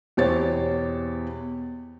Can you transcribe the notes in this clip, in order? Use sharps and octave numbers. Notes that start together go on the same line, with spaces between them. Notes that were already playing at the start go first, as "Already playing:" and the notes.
E2 B2 G4 C5 C#5 A6